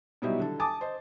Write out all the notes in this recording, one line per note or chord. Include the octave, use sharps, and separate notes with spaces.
B2 F#3 G3 D#4 E4 G4
D3 A4
G#5 A5 D6 D#6 A6
C5 D#5